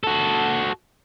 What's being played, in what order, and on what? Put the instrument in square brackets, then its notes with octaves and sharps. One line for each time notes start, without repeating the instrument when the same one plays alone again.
[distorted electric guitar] F#4 A4